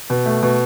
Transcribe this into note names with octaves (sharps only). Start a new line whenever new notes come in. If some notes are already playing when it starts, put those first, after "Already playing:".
B2
A3
B2